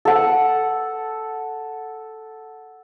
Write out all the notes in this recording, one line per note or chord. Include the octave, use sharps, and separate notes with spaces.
A4 F#5